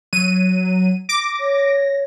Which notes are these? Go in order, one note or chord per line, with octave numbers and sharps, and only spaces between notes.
F#3 D#7
D6 A#6
C#5